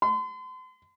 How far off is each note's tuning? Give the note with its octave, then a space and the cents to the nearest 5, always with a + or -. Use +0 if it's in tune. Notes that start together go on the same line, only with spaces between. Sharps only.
C6 -40